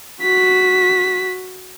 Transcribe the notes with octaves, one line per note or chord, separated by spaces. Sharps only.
F#4 B6